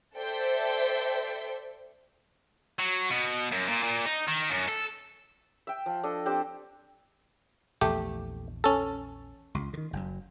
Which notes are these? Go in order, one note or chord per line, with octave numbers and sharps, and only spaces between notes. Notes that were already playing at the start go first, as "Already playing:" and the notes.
A4 C5 D5 E5 G5
F#3
B2
F#2
A#2
A#2
D#4
D#3
F#2
A4
E5 G5
F3
D4 A4 D#5
C4 D4 G4 C5
A#1 E2 A3 G4
C#4 A4
C#2
D3 D#3
F#1 F#2